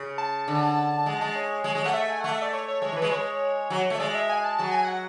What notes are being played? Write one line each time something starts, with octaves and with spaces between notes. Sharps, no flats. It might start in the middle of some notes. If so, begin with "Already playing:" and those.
Already playing: C#3
A5
D3
G#3
G#3
C#5
G#3
G#3
A3 F#5
E5
G#5
A3 F#5
E5
D5
C#5
C#5
G#3 C#5
E3
G#3 B4
G#3 C#5
F#3
A3
E5
G#3 D5
E5
G#5
A5
F#3 A5
G#5
F#5